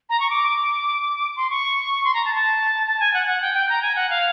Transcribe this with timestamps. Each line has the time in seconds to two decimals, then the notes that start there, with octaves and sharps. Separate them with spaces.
0.09 A#5
0.20 C#6
0.30 D6
1.36 C6
1.50 C#6
2.04 C6
2.14 A#5
2.25 A5
2.35 A5
2.87 A5
3.00 G#5
3.14 F#5
3.27 F#5
3.42 G5
3.54 G5
3.69 A#5
3.82 G#5
3.95 F#5
4.10 F5